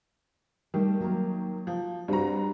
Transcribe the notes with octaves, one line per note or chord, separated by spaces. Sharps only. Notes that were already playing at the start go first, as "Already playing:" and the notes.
D#3 G3 A3 G4
F#3 A#3 A#4
F3
G2 C4 F#4 A#5